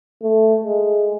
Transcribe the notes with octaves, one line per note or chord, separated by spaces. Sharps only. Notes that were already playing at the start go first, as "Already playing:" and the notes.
A3
G#3